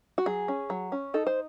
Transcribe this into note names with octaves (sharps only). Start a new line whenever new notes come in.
F#4
F#3 G#4
C#4
F#3
C#4
D#4 A4
C5